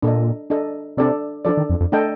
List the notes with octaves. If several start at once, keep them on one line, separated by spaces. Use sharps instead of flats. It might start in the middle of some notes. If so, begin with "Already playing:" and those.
A#2 D4 A4 D#5
D4 A4 D#5
C3 D4 A4 D5
F3 D4 A4 D5
D#3
F2
F2
A3 D4 A4 D#5 G5